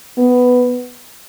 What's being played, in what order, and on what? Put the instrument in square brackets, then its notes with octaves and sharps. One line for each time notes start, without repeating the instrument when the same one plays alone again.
[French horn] B3